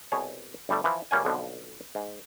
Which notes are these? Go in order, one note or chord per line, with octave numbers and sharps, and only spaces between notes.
C2 B2 G#4 C#5 A5
G1 G3 A3 A4
E3 F3 B4
C#2 G3 A#3 C#4 F#5 G#5
B1 F2 B2 D3 F3 B3
G#2